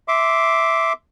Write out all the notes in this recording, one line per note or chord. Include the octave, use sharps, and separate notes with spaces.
E5 C6 D6